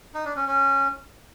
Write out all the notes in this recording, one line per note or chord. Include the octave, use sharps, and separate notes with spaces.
D#4
D4
C#4
C#4